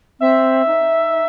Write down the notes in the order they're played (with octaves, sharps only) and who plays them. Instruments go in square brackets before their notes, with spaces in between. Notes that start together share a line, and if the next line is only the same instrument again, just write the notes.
[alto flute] C4 [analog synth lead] E5
[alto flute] D#4